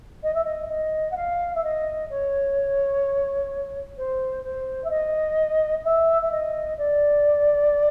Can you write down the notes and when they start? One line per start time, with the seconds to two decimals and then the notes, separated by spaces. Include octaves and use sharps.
0.23 D#5
0.34 E5
0.44 D#5
0.69 D#5
1.11 F#5
1.16 F5
1.55 E5
1.64 D#5
2.10 C#5
3.97 C5
4.44 C5
4.84 E5
4.90 D#5
5.84 E5
6.22 E5
6.31 D#5
6.78 D5